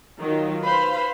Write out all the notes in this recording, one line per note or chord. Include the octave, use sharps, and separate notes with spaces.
D#3 F#3 F4
B4 C5 F5 B5